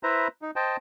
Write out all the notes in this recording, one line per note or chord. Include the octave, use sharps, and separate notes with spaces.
E4 B4 C5 E5 A#5
D#4
C5 D#5 G5 A5